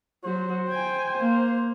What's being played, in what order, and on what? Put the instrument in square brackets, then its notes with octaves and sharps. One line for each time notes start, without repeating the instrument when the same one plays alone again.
[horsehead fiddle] F#3 F#4 [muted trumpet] C5
[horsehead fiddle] G5 G#5
A#3